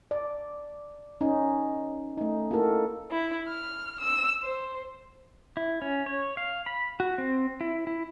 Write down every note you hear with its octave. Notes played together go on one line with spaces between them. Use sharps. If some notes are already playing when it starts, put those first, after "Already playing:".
D5
C#4 D#4
A3 D#4
A#3 E4 F#4 A4 A#4
E4
F6
E6
C5
E4
C#4
C#5
F5
B5
F#4
C4
E4
E4